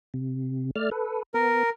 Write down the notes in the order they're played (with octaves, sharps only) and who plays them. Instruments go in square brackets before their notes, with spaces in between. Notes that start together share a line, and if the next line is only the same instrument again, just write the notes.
[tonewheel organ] C3
A3 D5 F6
A4 B4
[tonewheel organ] B3 [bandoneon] A#4